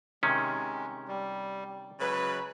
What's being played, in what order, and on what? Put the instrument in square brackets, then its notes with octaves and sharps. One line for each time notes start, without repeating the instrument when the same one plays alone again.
[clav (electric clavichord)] C3 D#3 C#4 [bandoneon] G#3
[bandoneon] G3
[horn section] C#3 G#3 B4 [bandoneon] F#3